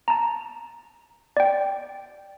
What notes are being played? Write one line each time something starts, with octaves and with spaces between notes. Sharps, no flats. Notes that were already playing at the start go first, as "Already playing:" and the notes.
A5 A#5
D5 G5